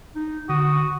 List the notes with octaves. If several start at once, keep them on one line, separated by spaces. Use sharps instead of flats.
D#4
D3 F#4 D#6